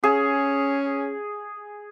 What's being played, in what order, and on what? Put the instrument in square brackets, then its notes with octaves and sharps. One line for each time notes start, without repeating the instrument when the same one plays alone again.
[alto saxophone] C#4 [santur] G#4